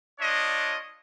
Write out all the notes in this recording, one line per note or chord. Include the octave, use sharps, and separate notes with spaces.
D4 F4 C#5 D#5